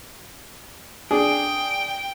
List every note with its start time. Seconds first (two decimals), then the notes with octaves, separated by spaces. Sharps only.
1.11 D4 G#4 G5